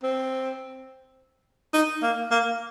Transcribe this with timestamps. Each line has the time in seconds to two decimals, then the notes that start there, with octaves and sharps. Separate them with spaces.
0.03 C4
1.74 D#4
2.02 A#3
2.31 A#3